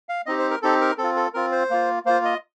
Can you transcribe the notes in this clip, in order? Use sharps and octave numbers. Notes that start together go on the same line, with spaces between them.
F5
C4 D#4 G4 D#5
C5
A#4
C4 D#4 G4 A4
A#4
C4 A4
F4
A4
C4 F4 A#4
C5
A#3 F4
A#3 F4 C5
D#5